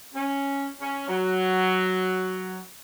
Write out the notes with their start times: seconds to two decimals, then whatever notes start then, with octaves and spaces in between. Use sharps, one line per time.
0.14 C#4
0.80 C#4
1.08 F#3